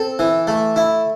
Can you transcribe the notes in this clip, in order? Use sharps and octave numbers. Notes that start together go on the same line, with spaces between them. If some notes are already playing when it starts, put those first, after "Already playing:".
Already playing: C4 A4
E3
A3
E4